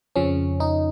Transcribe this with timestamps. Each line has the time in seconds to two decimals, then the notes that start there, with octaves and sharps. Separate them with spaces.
0.16 F2 C#3 F3 C#4
0.60 D#4